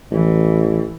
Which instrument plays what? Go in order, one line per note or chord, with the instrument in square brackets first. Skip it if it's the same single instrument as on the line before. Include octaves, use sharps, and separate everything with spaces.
[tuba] A1 [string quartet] E3